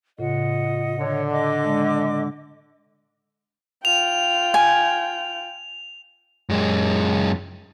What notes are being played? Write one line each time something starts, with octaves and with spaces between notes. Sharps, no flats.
A2 C#3 F4 D#5 F#5
D3 C#5
D#5 D6
G#3 D4
F4 G5 F7
G#5
F#2 G#3